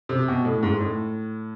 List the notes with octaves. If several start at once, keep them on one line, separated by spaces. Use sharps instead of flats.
C3
B2
A2
G#2
A2